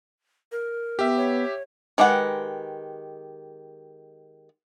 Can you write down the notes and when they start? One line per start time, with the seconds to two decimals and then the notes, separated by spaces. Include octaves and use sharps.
0.52 A#4
0.99 B3 G4 E5
1.17 C#5
1.98 D#3 G#3 G4 B4 F#5